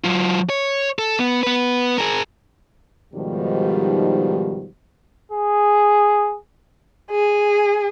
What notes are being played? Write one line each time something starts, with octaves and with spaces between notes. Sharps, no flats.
F#3 F4
C#5
A4
B3
B3 B4
G#4 A#4
G#2 B2 D#3 F3 G3
G#4
G#4